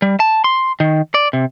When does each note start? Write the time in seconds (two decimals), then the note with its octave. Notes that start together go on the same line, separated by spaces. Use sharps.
0.02 G3
0.20 A5
0.44 C6
0.80 D#3
1.14 D5
1.33 C3